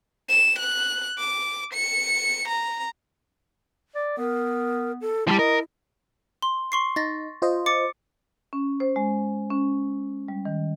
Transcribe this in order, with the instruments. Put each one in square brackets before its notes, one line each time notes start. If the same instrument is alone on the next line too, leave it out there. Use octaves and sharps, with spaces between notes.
[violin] E7
F#6
D6
C#7
A#5
[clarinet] D5
[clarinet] B3 [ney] A#4
[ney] A4
[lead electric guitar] F3 G3 [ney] E4 [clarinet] A5
[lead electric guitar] A#4 [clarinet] D#5
[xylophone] C6
C6 C#6 C7
[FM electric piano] D#4 [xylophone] A6 A#6
[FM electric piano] F4 C5 D#5
[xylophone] D6 A6 C#7
[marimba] C#4
C5
G#3
C#4
G3
D#3